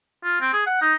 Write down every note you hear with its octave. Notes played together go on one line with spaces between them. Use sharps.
F4
C4
G#4
F#5
D#4